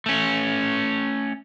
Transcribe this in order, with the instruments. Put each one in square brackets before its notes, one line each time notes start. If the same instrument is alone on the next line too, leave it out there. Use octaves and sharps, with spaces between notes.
[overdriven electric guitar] A3 C#4